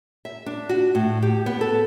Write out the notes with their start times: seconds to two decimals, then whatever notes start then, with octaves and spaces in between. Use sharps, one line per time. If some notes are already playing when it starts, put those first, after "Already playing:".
0.25 E5
0.46 D4
0.69 F#4
0.95 A2
1.22 G4
1.46 B3
1.61 A4